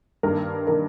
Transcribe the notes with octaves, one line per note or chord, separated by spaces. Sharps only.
G2 D#3 A#3 A#4
D#3 A#3 A#4